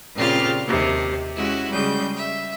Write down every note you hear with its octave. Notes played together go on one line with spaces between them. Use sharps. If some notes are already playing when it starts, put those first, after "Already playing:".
A#2 C#3 C4 F4 G4 F6
D#2 C3
G#3 C#4 E4 F#4
C#3 G3 G#3 G6
E5